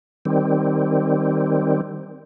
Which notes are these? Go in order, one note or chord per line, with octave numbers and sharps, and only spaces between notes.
D#3 G3 C4